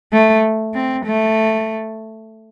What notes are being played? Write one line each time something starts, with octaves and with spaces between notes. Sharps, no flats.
A3
C4
A3